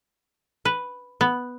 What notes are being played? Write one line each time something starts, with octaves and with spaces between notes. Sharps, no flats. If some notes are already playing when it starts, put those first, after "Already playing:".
B4
B3